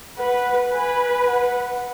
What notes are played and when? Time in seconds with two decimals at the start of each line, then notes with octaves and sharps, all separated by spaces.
0.18 B4 F#5
0.73 B4 G#5
1.28 F#5